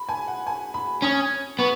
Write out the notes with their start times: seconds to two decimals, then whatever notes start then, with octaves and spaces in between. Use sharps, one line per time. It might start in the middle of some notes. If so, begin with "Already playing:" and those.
Already playing: B5
0.09 G#5
0.28 F#5
0.47 G#5
0.74 B5
1.02 C#4 D#6
1.59 B3 C#6